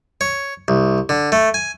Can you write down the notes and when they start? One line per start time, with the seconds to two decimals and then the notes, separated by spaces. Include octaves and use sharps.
0.21 C#5
0.68 C2
1.09 D3
1.32 A3
1.54 G#5